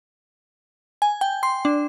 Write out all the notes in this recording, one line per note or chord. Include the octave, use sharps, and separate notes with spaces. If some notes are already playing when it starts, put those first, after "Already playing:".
G#5
G5
C6
D4